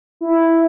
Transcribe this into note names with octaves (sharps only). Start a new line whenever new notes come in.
E4